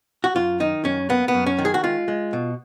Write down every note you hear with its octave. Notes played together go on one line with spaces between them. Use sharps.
F#4
F#2 F4
D#3 D#4
F#2 C#4
A#3 B3
B3
F#2
C#4
D#3
G#4
F#4
G#3 F4
G#3
B2